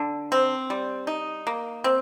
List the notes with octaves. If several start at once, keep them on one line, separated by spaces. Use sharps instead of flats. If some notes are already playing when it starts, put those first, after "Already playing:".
Already playing: D3
C4
G3
D#4
A#3
C4